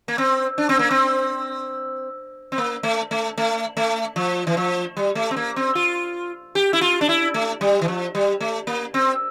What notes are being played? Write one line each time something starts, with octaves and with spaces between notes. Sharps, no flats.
A#3
C4
D4
C4
A#3
C4
C4
A#3
A3
A3
A3
A3
F3
E3
F3
G3
A3
C4
A#3
C4
F4
G4
E4
F4
D4
E4
A3
G3
E3
F3
G3
A3
A#3
C4